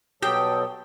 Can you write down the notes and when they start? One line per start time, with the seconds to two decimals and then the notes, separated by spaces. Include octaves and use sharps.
0.23 B2 F#3 G4 A4 G5 D#6